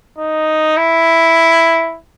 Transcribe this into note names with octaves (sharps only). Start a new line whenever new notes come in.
D#4
E4